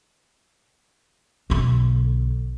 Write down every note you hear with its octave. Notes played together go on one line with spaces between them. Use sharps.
B1 D3